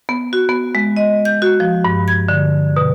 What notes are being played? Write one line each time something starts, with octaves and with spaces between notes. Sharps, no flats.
B3
F#4
B3
G#3
D#5
G6
F#4
F3
G2
G#6
D3
B2